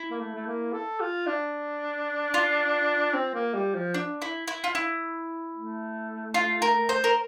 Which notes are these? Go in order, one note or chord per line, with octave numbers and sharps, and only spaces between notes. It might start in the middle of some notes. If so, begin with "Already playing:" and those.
Already playing: E4
A#3
A3
A3
A#3
A4
F4
D4
F4
C4
A#3
G3
F3
D4
E4
E4
F4
E4
A3
F4
A#4
C5
A#4